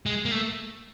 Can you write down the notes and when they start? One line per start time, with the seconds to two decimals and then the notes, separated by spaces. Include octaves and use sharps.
0.06 G#3
0.25 A#3
0.32 A3